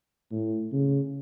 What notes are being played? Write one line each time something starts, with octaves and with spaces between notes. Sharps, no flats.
A2
C#3